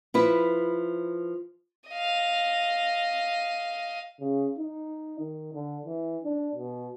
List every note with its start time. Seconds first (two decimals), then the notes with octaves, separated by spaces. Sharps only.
0.14 F3 E4 B4
1.89 D#5 F5
4.20 C#3
4.57 D#4
5.19 D#3
5.54 D3
5.86 E3
6.24 D4
6.55 B2